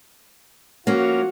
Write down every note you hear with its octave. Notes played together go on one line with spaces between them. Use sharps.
F3 A#3 C#4 F4 F#4